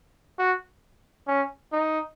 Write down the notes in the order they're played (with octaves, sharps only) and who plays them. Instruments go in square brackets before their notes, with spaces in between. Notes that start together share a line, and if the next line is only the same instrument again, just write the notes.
[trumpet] F#4
C#4
D#4